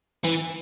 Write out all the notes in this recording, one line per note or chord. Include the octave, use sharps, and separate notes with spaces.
E3